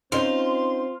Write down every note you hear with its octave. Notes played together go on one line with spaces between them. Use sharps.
C4 C#4 D#4 F4 C6